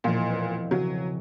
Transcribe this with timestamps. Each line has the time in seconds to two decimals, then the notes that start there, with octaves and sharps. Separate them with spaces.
0.04 E1 A#2 F3 D#5
0.28 C4 B4
0.71 C#3 F#3